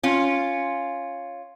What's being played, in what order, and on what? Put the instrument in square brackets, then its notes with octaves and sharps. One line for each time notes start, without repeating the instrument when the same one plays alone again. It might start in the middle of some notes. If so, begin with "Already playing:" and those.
[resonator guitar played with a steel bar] C#4 F4